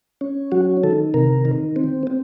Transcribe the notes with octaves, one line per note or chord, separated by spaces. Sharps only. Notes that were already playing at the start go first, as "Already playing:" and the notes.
C#4
F#3 F#4
D#3 A4
C3 A#4
D#3
C4
C4